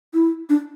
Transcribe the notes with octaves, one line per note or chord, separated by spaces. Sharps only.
E4
D4